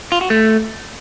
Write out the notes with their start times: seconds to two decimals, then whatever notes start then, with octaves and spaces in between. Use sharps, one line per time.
0.12 F4
0.21 F#4
0.30 A3